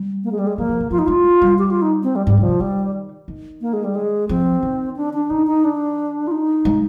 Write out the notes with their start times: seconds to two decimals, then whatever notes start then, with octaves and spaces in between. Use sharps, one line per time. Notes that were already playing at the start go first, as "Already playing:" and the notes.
Already playing: G3
0.24 A#3
0.32 G#3
0.39 G3
0.47 G#3
0.58 F3 A#3
0.69 F3
0.80 D3
0.91 F3 F4
0.98 D#4
1.06 G#3 F4
1.42 G3
1.59 G4
1.70 F4
1.82 D#4
2.03 C4
2.16 G3
2.26 G#2 G3
2.37 C3
2.43 F3
2.48 D3
2.61 D#3 G3
3.28 D#3
3.61 A#3
3.73 G#3
3.84 G3
3.95 G#3
4.29 F3 C4
4.63 D#3
4.96 D4
5.14 D4
5.30 D#3 D#4
5.47 D#4
5.64 D4
6.27 F4
6.31 D#4
6.65 G#3